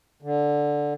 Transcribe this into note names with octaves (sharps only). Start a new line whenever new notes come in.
D3